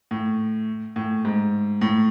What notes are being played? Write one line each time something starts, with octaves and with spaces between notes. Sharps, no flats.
A2
A2
G#2
A2